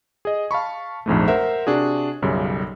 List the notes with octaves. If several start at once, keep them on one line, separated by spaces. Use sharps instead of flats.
G#4 D#5
F5 A5 B5 C#6
A#1 F2 G#2 A3
A#4 C5 E5 F#5
C3 D4 F#4 G#4
B1 F#2 C#3 G3